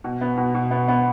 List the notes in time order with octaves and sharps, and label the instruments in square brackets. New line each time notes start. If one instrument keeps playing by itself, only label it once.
[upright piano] B2
B3
B2
B2
B3
B3